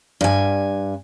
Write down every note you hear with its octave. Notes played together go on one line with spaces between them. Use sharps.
G2 G#5